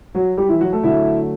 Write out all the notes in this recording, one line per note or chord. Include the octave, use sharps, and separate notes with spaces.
F#3 F#4
G3 G4
E3 E4
F#3 F#4
A3 A4
D3 F#3 A3 E4 E5